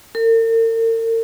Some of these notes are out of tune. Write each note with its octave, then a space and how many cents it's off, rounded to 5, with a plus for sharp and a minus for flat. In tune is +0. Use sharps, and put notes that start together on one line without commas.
A#4 -45